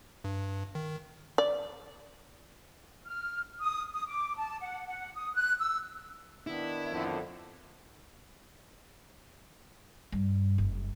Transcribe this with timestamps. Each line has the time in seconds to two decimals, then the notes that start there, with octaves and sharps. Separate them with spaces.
0.24 G2
0.75 D#3
1.38 D5
3.04 F6
3.61 D#6
3.93 D#6
4.07 D6
4.37 A5
4.61 F#5
4.86 F#5
5.15 D#6
5.35 F#6
5.59 E6
6.47 D#3 B3 D4 E4
6.91 F2 A2 D3
10.12 G2
10.58 F#1